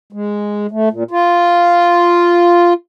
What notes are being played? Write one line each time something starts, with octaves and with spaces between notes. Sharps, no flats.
G#3
A3
A#2
F4